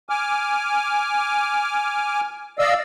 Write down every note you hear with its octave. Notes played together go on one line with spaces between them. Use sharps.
G#5 D6 F6
D5 D#5 F5 E6